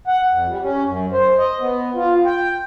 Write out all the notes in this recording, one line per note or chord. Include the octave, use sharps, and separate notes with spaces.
F#5
F2
G3
C#4
F#2
C5
D#5
B3
F4
G5